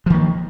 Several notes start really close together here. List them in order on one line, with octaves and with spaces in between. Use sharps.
F3 D#3 A#3